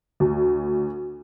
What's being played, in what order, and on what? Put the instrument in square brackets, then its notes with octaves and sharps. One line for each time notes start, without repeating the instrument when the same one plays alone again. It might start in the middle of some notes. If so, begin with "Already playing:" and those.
[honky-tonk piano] D2